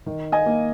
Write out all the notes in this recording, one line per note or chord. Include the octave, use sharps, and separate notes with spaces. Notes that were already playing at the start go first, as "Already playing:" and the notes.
D#3
D#5 G#5
A#3